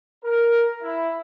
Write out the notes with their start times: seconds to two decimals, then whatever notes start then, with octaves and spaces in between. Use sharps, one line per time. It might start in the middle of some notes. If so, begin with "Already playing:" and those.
0.24 A#4
0.82 E4